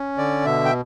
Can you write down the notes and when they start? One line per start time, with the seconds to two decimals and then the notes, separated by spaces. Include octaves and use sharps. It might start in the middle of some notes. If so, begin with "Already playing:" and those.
Already playing: C#4
0.18 D3 D5
0.45 B2 E5
0.65 G5